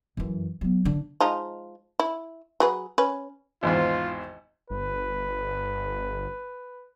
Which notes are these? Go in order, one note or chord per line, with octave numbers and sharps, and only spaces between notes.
F#2 E3
F#3 B3
D3 D4
F3 G#3 D#4
E4
F#3 G#4 B4
C#4 B4
G#1 E2 G#2 F4
G1 B4